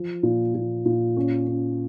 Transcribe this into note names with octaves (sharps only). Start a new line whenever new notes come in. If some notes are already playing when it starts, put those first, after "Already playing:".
Already playing: F3
A#2
A#2
A#2
C#4
C#4